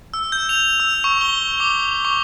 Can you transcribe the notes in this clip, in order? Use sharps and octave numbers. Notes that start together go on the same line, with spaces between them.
E6
G6
F7
E6
C#6
G7
D6
C#6